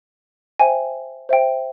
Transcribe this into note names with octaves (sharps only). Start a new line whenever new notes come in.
C5 E5 G5 G#5
C5 E5 G5